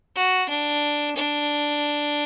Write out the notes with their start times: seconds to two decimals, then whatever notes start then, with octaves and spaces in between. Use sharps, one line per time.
0.16 F#4
0.50 D4
1.17 D4